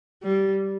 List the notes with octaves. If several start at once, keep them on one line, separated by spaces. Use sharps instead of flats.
G3